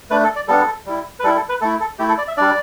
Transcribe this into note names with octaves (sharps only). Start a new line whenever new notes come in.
A3 D4 B4
A4
D5
G3 B3 D4 A4
G3 E4
B4
G3 E4 A4
A4
B4
A3 E4 A4
A4
A3 E4 G4
A4
D5
E5
G3 D4 D5